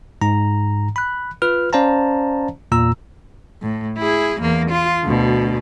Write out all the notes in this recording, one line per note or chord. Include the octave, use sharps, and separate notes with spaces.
G#2 A#5
B5 F#6
F4 B4 F6
C#4 C5 D5 F5 A5 A#5
E2 A#2 A#5 E6
A2
E4 G#4
E2 A#3
F4
D2 B2